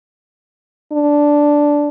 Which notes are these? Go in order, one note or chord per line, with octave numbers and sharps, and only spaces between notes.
D4